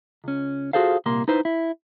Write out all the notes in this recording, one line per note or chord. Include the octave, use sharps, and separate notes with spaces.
C#2 C#4
F4 F#4 G#4 A4 C5 F5
C2 A#2 A#3 C6
D#4 E4 B4 C5
E4